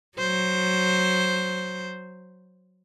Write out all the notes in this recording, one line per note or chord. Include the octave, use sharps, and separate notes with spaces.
F#3 C5